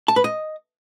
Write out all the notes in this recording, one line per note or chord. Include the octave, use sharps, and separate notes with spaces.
A5
B4
D#5